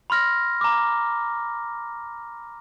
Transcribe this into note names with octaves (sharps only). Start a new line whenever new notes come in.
B5 C6 F6 A#6
A#5 D6